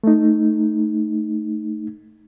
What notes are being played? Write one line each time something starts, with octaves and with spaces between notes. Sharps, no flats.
A3 D#4